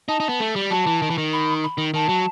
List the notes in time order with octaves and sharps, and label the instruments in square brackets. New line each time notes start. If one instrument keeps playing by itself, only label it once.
[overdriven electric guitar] D#4 [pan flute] A5
[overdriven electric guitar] D#4
B3
A3
G3
[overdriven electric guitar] F#3 [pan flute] A5
[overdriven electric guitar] E3
D#3
E3
D#3
[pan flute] B5
B5
[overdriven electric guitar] D#3
[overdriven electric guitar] D#3 [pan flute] A5
[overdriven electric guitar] F#3